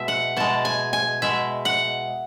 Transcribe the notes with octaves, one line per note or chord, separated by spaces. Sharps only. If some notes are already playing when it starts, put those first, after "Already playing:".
Already playing: B2 G#3 E5
F#5
B2 G#3 A5
G#5
G#5
B2 G#3 E5
F#5